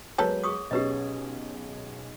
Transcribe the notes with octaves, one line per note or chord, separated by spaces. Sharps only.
F#3 G#3 A#3 B3 A4 B4 C#5
G#4 C#6 D#6
B1 C#4 G4 G#4 B4 D#5